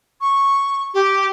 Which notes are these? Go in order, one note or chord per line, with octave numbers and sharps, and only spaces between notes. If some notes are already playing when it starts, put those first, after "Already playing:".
C#6
G4